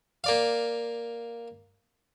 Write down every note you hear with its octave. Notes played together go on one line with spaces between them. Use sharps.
A#3 D5 F5